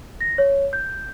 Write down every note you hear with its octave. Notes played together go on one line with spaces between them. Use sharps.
A#6
C#5
G6